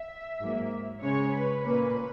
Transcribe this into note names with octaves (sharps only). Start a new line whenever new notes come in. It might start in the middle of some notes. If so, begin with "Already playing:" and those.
Already playing: E5
G#2 F#3 A#3
C#3 G#3 C#4 C#5
B4
A#2 A#3 C#4 B4